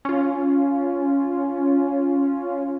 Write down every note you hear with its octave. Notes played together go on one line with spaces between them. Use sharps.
C#4 F4